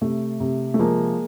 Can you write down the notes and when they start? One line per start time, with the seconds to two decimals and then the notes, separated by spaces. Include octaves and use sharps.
0.01 C3 A3
0.40 C3
0.74 A3
0.79 F3 G#3 A#3